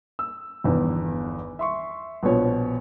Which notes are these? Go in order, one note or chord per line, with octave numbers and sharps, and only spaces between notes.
E6
G1 E2 D#3
E5 C6 C#6
A#1 B2 F3 C#5